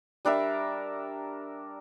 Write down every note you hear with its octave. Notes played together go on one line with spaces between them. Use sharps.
G3 D4 A#4 E5